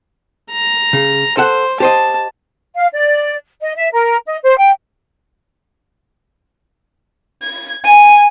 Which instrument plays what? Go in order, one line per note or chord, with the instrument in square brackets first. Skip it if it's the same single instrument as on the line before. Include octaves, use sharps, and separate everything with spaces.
[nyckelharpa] A#5
[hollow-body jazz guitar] C#3
[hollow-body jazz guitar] A4 F#5 [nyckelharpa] C5
[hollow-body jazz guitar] G4 C5 D#5 [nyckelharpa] A5
[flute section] F5
D5
D#5
E5
A#4
D#5
C5
G5
[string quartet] G#6
G#5